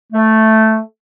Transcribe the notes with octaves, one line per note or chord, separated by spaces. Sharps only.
A3